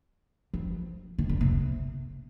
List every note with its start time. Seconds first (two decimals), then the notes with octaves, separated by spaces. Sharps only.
0.54 F3
1.18 D#3
1.29 D3
1.41 C3